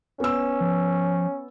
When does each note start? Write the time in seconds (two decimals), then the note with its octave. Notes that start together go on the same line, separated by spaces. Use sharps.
0.20 B3 C#4 E6
0.60 F3